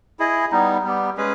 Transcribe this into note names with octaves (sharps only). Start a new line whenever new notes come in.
E4 G#4 D#5
G3 B3 D#4
G3 B3 G4
G#3 C#4 G#4 B4